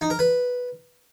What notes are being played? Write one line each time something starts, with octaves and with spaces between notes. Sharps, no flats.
D#4
A#4
B4